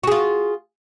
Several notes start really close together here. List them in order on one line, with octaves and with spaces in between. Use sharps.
F#4 G#4 F4